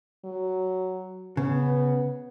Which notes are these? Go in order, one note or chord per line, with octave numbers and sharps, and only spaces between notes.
F#3
C#3 B3